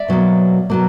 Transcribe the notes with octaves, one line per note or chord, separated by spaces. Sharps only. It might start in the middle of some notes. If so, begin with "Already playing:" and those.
Already playing: D5 E5
B2 F#3 A#3
B2 F#3 A#3